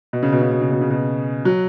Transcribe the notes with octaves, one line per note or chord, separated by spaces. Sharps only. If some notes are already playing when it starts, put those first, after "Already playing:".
B2
C#3
B2
C#3
B2
C#3
B2
C#3
B2
F#3